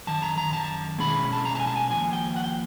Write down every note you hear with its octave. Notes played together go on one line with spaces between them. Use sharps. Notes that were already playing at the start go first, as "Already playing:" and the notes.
F#2 D#3 A5
A#5
A#5
A5
B2 G#3 C#4 E4 B5
A5
A#5
A5
G#5
A5
G#5
D#2 C#3 F3 G#5
G5
F#5
G5